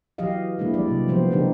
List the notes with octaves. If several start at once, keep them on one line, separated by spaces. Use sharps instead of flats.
E3 F#3 G4 D#5 F5
G#3 A#3 D4 E4
E3 G3 D5
C3 F#3
F3 G3 A3 B3 G4 C5
C#3 E3 D4 D#4 G4 A#4